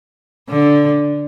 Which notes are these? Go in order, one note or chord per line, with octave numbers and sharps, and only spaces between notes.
D3